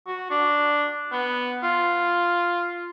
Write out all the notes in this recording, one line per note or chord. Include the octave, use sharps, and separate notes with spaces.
F#4
D4
B3
F4